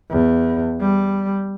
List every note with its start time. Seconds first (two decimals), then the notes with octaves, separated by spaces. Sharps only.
0.10 E2
0.80 G3